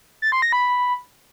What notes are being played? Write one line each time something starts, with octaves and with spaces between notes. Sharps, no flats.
A6
C6
A#6
B5